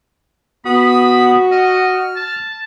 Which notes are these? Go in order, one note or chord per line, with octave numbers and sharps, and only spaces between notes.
B3 F#4 B5 D#6
D#5 F6
A5